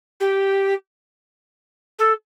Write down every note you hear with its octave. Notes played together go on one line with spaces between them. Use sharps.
G4
A4